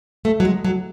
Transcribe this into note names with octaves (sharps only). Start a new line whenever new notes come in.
A3
F#3
G#3
F#3